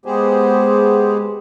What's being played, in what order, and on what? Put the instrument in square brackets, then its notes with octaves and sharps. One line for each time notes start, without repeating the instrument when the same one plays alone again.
[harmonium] G#3 B3 G4 G#4 C5